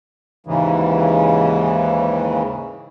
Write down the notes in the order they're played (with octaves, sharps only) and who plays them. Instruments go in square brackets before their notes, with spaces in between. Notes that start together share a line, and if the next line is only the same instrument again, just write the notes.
[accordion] D#2 G#2 C#3 E3